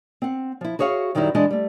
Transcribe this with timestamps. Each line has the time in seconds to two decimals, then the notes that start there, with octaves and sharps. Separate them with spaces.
0.22 C4 F#5
0.61 F3 E4
0.79 F#4 G#4 C#5 E5 F5
1.15 F#2 D#3 F#3 G3 D#4 E4
1.35 E3 G#3 D4 E4 D#5
1.51 G3 A3